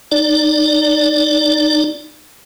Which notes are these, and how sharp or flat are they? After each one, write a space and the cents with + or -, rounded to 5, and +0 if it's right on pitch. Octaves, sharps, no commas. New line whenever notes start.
D#4 -25 D5 +0